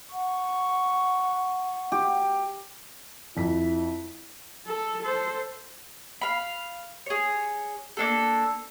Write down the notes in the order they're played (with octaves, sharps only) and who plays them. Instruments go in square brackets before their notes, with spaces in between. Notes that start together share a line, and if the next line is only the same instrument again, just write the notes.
[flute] F#5 [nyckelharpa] C#6
[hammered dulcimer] G4
[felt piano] F2 B6 [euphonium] E4
[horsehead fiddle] A4
A4 C5
[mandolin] F5 B5
G#4 C#5
A#3 D4 A4